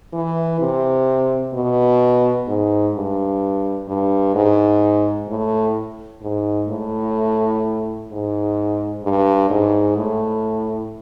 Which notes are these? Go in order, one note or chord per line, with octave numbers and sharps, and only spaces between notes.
E3
C3
B2
G#2
G2
G2
G#2
A2
G#2
A2
G#2
G2
G#2
A2